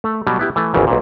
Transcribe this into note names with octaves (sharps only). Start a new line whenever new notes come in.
A3
B2 F#3 G3
B3 E4 G4
E3 A3
G#1 E2 C#3 E3
B1 A#2